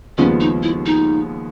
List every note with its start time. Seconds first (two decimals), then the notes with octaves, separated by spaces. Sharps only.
0.18 D#2 C#3 F3 G#3 B3 C#4
0.40 D#4
0.63 E4
0.86 D#4